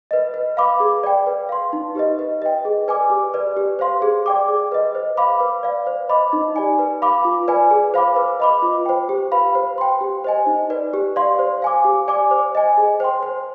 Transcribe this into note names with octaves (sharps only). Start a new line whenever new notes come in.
B4 D#5
B4
F5 B5 D6
G#4
D5 G5
B4
F5 C6
D#4
G4 B4 D#5
B4
D#5 G5
G#4
B4 D5 G#5 D6
G4
B4 D5
G4
C5 F5 C6
G#4
D5 G5 D6
G#4
B4 D#5
C5
F5 B5 D6
B4
D5 F5
C5
D#5 B5 D6
D#4
G4 D5 G#5
B4
F5 B5 D6
F4
B4 D5 G#5
G#4
C5 F5 B5 D6
B4
D#5 B5 D6
F4
C5 G5
G4
B4 F5 B5
C5
G5 C6
G4
C5 D#5 G#5
D#4
B4 D5
G4
D5 F5 C6
C5
F5 G#5 D6
G4
D5 G#5 D6
C5
D#5 G#5
G#4
C5 G5 C6
C5